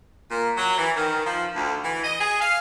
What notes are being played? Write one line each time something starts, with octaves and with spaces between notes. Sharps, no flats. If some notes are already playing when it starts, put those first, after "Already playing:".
A#2
F#3
E3
D#3
F3
D2
E3
D#5
G#4
F5